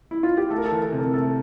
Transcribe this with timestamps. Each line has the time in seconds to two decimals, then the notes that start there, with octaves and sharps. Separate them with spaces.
0.11 E4
0.23 F4
0.38 G4
0.50 A3 A4
0.58 A#4
0.65 A4
0.71 E3
0.82 A4
0.92 C3
0.98 A#4
1.13 A3 A4